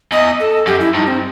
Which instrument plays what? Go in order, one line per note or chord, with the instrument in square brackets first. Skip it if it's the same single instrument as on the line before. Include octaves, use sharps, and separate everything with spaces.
[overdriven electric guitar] E2 [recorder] D#5
[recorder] A4
[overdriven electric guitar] F#2 [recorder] G4
[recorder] E4
[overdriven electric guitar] G2 [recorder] D#4
[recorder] C4